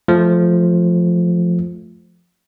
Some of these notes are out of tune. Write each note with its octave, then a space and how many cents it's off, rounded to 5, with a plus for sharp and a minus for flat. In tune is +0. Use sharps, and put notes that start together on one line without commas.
F3 +0 A3 -15